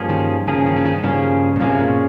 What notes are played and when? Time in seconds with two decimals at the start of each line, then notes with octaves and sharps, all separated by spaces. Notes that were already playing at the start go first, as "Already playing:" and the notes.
Already playing: G2 F3 A#3 C#4 G#4
0.09 D#3
0.47 G2 C#3 F3 A#3 C#4 G#4
0.66 D#3
0.76 C#3
0.85 D#3
1.03 G2 C#3 F3 A#3 C#4 G#4
1.56 A#2
1.60 G2 C3 F3 A#3 C#4 G#4
1.80 A#2